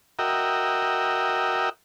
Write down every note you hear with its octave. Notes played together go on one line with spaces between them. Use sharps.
F#4 A#4 D#5 E5 G5